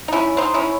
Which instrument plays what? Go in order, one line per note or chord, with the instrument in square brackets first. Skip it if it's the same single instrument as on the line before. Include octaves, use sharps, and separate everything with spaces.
[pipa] D#4
C#4 E4
C4 D#4
C#4 E4